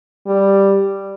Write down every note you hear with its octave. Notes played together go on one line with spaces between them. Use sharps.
G3